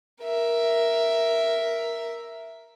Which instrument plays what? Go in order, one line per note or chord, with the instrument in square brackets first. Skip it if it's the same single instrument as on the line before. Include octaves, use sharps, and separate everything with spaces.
[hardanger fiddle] A#4 E5